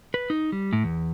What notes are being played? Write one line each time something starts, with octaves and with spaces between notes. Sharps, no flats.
B4
D#4
G3
A2
E2